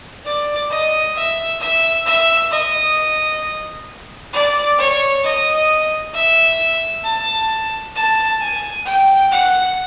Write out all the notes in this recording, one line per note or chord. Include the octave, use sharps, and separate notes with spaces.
D5
D#5
E5
E5
E5
D#5
D5
C#5
D#5
E5
A5
A5
G#5
G5
F#5